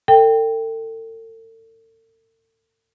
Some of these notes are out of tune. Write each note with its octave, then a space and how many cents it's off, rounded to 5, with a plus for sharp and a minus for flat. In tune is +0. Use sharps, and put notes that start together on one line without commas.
A4 +40 G5 +0